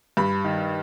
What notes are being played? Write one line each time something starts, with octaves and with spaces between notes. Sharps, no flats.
G2 B5
D#3